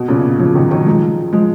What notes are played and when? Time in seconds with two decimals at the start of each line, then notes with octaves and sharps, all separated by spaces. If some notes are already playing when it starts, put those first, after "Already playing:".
Already playing: B2
0.08 A#2 C#3
0.39 C#3 F3
0.55 D#3 F#3
0.71 D#3 F#3
0.86 F3 G#3
1.33 F3 G#3